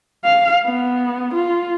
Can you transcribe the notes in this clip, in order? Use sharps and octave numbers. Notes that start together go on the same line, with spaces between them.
F5
B3
F4